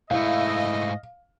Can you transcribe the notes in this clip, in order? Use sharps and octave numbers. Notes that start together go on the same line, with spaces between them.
G#2 A3 E4 D#5 F5